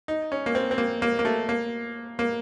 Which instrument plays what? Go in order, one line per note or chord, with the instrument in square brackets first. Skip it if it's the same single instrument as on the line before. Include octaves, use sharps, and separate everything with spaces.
[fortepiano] D#4
C#4
A#3
C4
C4
A#3
A#3
A#3
A3
A#3
A#3